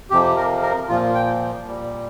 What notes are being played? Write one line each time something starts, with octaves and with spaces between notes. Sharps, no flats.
F2 C3 F3 G4
A#4
A#4
A#2 F3 F4
G5
A#2 G3